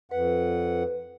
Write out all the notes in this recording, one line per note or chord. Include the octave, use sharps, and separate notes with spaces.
F2 B4 F#5